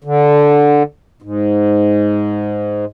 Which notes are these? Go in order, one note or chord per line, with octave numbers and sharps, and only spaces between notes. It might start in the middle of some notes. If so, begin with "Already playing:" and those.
D3
G#2